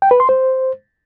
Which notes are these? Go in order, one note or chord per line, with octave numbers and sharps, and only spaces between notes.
G5
B4
C6
C5